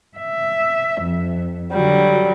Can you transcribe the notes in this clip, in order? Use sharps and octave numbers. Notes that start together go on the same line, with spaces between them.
E5
F2
D3 F#3 G3